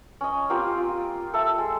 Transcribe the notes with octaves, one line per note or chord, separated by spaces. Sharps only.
C#4 D#5
A#3 C4 F4 G4
F4
A4 E5
G#3